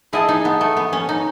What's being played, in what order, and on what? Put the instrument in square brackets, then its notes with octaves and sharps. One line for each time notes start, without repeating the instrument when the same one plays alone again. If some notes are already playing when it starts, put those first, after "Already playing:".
[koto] E4 [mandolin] G#4 D#5 F#5 A5
[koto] D#4
B3
A3
B3
C#4
D#4